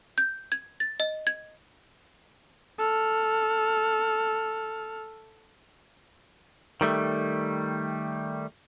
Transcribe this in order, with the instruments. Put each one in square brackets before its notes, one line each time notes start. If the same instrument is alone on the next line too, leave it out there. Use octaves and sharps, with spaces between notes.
[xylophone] G6
G#6
A6
D#5
G#6
[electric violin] A4 F6
[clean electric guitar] D#3 G3 A3